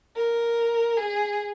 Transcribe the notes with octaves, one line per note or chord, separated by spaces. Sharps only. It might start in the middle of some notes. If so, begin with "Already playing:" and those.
A#4
G#4